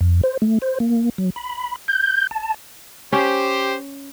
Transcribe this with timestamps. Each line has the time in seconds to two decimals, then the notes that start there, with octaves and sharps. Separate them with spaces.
0.01 F2
0.23 C5
0.42 A3
0.62 C5
0.80 A#3
1.18 F#3
1.36 B5
1.88 G6
2.31 A5
3.12 C#4 G4 C5